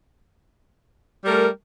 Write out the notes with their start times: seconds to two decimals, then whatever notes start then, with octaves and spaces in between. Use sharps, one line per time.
1.24 G3
1.27 A#4
1.30 A3